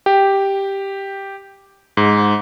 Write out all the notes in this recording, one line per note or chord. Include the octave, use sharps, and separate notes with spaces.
G4
G#2